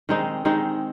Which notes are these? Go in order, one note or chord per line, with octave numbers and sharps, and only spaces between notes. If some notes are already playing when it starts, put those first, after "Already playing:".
D#3 G#3 C4 D#4
D#3 G#3 C4 D#4